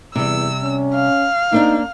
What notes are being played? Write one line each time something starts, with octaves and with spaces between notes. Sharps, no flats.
E2 C3 G3 E6
C#4
F5
A#3 C4 D4 D#4